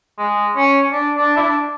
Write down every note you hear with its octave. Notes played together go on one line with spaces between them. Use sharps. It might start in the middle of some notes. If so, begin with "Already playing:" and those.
G#3
C#4
D4
D4
E4
D4